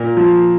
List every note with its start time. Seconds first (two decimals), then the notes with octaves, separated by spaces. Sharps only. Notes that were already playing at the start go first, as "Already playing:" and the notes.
Already playing: A#2 A#4
0.17 F3